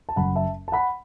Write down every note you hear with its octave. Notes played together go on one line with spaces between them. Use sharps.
A5
F#1 F#2 F#3 F#5 B5
E5 A5
A5
F#5 B5